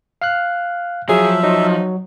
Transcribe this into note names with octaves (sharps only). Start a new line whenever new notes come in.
F5 F6 F#6
F3 F#3 G#4 E5
F#3 D#4